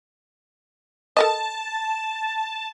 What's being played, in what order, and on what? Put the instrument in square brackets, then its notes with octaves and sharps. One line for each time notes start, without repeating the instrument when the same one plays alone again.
[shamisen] A4 A#4 D#5 [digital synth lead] A5